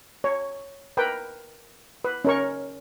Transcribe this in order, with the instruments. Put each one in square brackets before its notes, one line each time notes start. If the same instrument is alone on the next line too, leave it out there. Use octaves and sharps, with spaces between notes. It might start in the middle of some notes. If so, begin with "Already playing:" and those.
[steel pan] C#5
A#4 B4 G5
B4
C#4 A#4 C#6